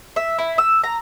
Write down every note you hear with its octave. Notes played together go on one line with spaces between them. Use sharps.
E5
E4
E6
A#5